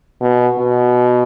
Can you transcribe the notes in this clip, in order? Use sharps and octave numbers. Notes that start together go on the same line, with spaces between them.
B2
B2